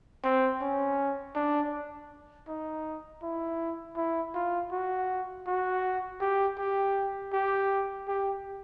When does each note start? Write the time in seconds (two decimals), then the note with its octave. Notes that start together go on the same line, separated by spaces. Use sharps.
0.24 C4
0.61 C#4
1.35 D4
2.48 D#4
3.22 E4
3.97 E4
4.35 F4
4.72 F#4
5.47 F#4
6.21 G4
6.58 G4
7.33 G4
8.08 G4